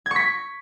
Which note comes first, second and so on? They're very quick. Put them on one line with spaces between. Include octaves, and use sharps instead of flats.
G#6 C#6 B6